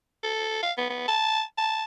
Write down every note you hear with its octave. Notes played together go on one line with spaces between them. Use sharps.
A4
F5
B3
B3
A5
A5